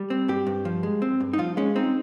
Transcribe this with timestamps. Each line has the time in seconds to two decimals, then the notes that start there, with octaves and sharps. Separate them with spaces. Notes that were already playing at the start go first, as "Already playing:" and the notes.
Already playing: G3
0.10 C4
0.28 G2 G4
0.47 G2
0.65 F3
0.83 G#3
1.02 C4
1.20 G2
1.33 D#4
1.38 F3 F4
1.57 G#3 C#4
1.76 C4 D#4